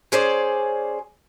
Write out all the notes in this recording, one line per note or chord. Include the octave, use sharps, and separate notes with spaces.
C#4 G#4 C5 D5